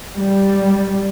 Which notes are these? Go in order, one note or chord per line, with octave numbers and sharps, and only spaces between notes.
G3